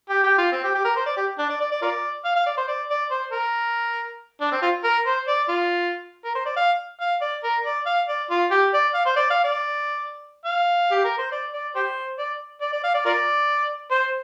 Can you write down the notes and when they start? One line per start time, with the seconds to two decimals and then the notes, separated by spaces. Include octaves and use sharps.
0.09 G4
0.24 G4
0.38 F4
0.52 C4
0.64 G4
0.74 G4
0.84 A#4
0.96 C5
1.06 D5
1.17 G4
1.38 D4
1.50 D5
1.60 D5
1.72 D5
1.82 F4 A#4 D5
2.25 F5
2.36 F5
2.46 D5
2.57 C5
2.68 D5
2.90 D5
3.11 C5
3.32 A#4
4.41 D4
4.52 C4
4.62 F4
4.84 A#4
5.06 C5
5.27 D5
5.49 F4
6.24 A#4
6.35 C5
6.46 D5
6.56 F5
7.00 F5
7.21 D5
7.43 A#4
7.65 D5
7.86 F5
8.08 D5
8.30 F4
8.51 G4
8.73 D5
8.94 F5
9.06 C5
9.16 D5
9.30 F5
9.44 D5
10.45 F5
10.91 G4
11.04 A#4
11.18 C5
11.32 D5
11.53 D5
11.75 G4 C5
12.19 D5
12.61 D5
12.73 D5
12.84 F5
12.94 D5
13.05 F4 A#4 D5
13.91 C5